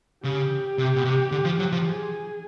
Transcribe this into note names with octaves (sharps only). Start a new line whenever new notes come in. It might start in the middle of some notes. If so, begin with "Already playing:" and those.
C#3 G4
C3
B2
C3
D3
F3
F#3
F3
G#4